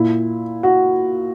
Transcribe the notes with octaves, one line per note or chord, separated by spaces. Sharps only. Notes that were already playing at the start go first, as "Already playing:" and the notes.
Already playing: A#2 E4
F#4